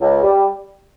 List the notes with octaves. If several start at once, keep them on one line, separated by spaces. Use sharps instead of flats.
C#2
G3